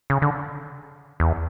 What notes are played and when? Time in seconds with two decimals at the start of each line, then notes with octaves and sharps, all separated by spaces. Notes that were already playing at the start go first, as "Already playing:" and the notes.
0.10 C#3
0.22 D3
1.20 E2